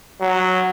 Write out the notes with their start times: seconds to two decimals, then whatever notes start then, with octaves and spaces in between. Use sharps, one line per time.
0.21 F#3